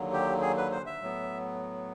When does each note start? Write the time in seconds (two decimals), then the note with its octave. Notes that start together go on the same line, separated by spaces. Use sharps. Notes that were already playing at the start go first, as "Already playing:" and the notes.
Already playing: D#2 D3 F#3
0.13 G4
0.42 G#4
0.57 B4
0.72 C5
0.86 E5
1.01 A2 F#3 B3